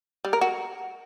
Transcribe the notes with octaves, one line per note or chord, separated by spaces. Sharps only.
G3
A#4
F#4